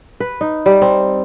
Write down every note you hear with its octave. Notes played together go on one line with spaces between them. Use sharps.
B4
D#4
G3
C4